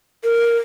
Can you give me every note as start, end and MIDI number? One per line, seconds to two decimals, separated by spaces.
0.24 0.57 70